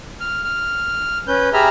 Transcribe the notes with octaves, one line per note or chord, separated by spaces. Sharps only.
F6
F6
C#4 B4 G6
G4 G#4 E5 A#5 B5 F6